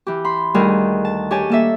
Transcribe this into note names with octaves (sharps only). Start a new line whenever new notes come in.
E3 G4
B5 C6
D2 D#3 G3 G#4 A#4
A5
G4 G#4 C#5 G#5 A5
A#3 A4 E5